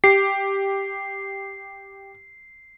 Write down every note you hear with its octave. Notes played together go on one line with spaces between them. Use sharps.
G4 C7